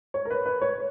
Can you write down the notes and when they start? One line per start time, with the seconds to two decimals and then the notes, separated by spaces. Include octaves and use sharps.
0.14 C#5
0.25 A#4
0.30 B4
0.46 B4
0.61 C#5